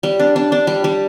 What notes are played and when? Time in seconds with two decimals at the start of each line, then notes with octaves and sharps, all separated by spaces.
0.03 G3
0.19 D4
0.36 D4
0.52 D4
0.67 G3
0.84 G3